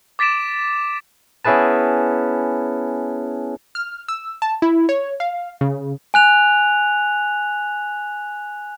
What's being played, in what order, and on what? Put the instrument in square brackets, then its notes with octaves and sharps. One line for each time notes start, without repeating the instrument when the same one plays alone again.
[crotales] D6 A6 B6 D7 E7
[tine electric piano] B3 C#4 E4 G#4 B4 A5
[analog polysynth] F6
E6
A5
E4
C#5
F5
C#3
[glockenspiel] G#5 F#6 F7